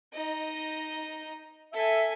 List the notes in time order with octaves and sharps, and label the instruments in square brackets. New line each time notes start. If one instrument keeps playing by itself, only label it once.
[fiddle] D#4 D#5
[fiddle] A4 G#5 [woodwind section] E5